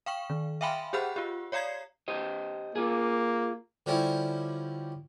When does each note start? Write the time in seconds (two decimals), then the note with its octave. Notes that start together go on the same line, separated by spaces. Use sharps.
0.06 F5 G5 C#6
0.30 D#3
0.61 E5 F5 G5 G#5 B5 C6
0.93 G4 G#4 C5 F#5 B5 F6
1.16 F4 G4
1.52 C#5 D5 F5 A#5 G#6 C7
2.08 G4 C5 D#5
2.76 A#3 F4 G#4
3.86 D3 F3 G3 C#4 E4